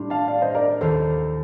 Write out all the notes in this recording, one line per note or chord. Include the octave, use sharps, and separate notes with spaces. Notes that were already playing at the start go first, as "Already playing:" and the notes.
Already playing: A2 G3 D4 F4
F5 A5
D5 F5
C5 D#5
A#4 D5
A#4
D#2 D#3 A#3 F4 A4 C5